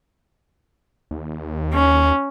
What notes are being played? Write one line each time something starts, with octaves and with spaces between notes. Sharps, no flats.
D#2
C#4